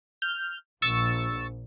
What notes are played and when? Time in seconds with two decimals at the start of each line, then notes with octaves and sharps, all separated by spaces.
0.22 F6 G6
0.82 A#1 C#6 E6 A6